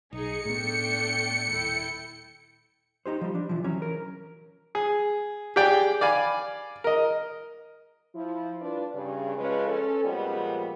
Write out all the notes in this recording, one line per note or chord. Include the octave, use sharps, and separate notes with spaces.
B1 D#4 G#4 C#7
A2 A3 B3 D4 G5
D#1 E4 A4 G5
D#4 G4 C5
F3 G3
D4
B1 E3 F3
E3 F#3 C#4
A#4
G#4
G4 G#4 D5 G5
D5 F5 G#5 B5
A#4 D#5
F3 E4
G2 D4 F4 B4 D5
G2 C#3
C#3 F3 G#3 C#4 B4
C#4 A4
F2 A#2 F3 G3 G#3 B3